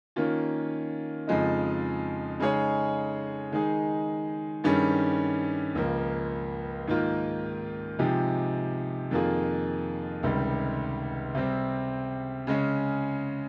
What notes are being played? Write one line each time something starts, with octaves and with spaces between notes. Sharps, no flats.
D#3 A#3 C#4 F4
F2 C#3 F3 G#3 D#4
C#3 G#3 D#4 G#4 C#5
D#3 G#3 D#4 G#4
G2 D#3 G3 C#4 G#4
C#2 C#3 F3 A#3
G#2 D#3 A#3 F4
C3 F3 G#3 D#4 G4
F2 D#3 A#3 F4 G#4
C#2 C3 D#3 G3
C3 G3 C4
C#3 G#3 C#4